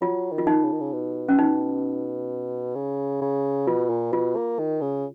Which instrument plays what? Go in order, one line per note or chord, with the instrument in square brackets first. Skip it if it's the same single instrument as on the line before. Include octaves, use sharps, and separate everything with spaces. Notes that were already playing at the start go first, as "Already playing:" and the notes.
[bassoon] F#3 [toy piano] F4
[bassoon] D#3
[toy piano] F4
D#4
[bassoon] C#3
D#3
C#3
B2
[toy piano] C#4
D#4
[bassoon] C#3
C#3
[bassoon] B2 [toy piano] F4
[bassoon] A#2
[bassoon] B2 [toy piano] F4
[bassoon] A#3
D#3
C#3